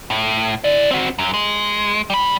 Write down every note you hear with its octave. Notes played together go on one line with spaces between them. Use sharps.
A2
E4 D5
C4 F#4
F#2
G#3
G3 B5